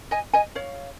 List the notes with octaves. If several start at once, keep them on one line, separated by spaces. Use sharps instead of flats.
D#5 G#5
D#5 G#5
C#5 F5